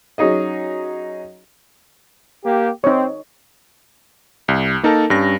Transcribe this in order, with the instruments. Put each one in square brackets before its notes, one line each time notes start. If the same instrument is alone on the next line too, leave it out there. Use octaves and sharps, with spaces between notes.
[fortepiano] F#3 C#4 D#4 G#4 D#5
[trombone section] A#3 G4
[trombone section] C4 [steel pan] D#4 C#5
[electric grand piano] C2
A#3 D#4 A4 A#4 A5
G2 G3 C#4 A#6